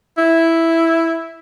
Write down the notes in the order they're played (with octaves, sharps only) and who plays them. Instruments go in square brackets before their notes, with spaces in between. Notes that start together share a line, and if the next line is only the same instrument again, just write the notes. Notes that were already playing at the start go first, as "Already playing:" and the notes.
[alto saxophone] E4